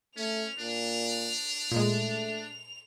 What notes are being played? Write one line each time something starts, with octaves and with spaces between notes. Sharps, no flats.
A3 C#4 F7
A#2 D4
A#2 G#3 A3